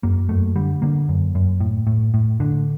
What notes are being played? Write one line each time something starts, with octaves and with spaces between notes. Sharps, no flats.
F#2 A#3
F#2 A3
D3 G3
D3 A#3
F#2
F#2
A2
A2
A2
A2 D3